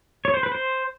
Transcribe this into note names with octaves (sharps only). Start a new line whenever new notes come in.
C#5
C5
B4
C5